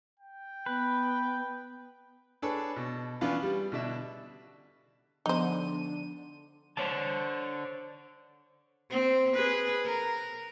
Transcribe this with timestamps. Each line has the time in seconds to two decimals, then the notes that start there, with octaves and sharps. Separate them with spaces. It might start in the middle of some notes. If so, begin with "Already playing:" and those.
0.20 G5
0.66 B3 B4
2.42 D4 G#4 A4 B4 C#5
2.76 B2
3.21 E3 B3 C#4 D4 F4
3.43 G3
3.72 B2 D3 D4 E5
5.26 D3 F3 B3 D4 D#4 C5 D#7
6.77 D3 C5 C#5 A5
8.90 C4
9.34 G#4 B4
9.85 A#4